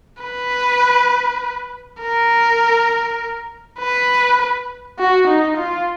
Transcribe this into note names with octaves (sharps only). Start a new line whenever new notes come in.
B4
A#4
B4
F#4
D#4
F4